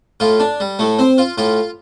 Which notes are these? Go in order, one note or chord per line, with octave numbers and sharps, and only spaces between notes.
A2 F4
D4
G3
A2 A3
C4
F4
A2 F4